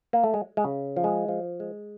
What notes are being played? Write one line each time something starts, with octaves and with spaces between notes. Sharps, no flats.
A#3
A3
G#3
G#3
C#3
F3
G#3
F3
G#3